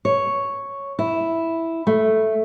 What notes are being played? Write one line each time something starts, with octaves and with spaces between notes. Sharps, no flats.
C#5
E4
A3